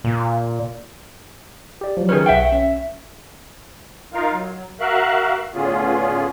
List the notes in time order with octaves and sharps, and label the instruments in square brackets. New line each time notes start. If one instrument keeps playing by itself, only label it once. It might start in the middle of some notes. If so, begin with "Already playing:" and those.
[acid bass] A#2
[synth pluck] G4 D5
F3 F#3
[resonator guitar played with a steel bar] D#3 C#4 [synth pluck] G#4 A#4 B4
[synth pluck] B1 C#6 D7 [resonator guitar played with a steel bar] E5 F#5 G5
[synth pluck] C#4 [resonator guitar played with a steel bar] E5
[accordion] D#4 F4 A#4 F5
F#3
F#4 A#4 E5 F5 F#6
A2 D3 B3 C#4 F4 G#4